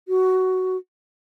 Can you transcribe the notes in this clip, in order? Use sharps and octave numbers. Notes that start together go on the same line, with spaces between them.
F#4